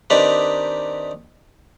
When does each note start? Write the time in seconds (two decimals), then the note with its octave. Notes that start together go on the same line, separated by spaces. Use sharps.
0.10 D#3 C4 D4 D#4 G4 B4